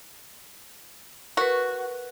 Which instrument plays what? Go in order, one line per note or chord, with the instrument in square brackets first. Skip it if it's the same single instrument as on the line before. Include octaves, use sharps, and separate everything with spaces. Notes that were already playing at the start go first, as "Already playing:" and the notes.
[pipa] F#4 [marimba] A#4 B4